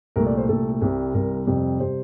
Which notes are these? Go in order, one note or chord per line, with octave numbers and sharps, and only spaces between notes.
C2 A#2 A3 A#4
D5
C5
C2 A#2 A3 A4
C2 C3 G3
C2 C3 G3 A#4
F2 C3 G3
C3 G3 C5